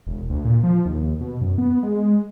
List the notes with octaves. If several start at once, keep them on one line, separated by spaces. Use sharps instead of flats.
E1
D2
A#2
F3
D#2
B2
F#2
B3
G#3